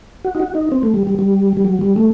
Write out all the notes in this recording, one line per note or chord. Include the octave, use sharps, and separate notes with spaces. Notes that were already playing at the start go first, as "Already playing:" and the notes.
F#4
D#4
F#4
D#4
C4
A3
G3
G3
G3
G3
F#3
G3
A3